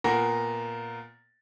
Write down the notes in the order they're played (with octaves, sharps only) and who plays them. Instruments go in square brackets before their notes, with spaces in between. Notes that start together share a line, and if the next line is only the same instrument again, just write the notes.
[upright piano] A#2 A#3 B3 A#4 F#5 A#6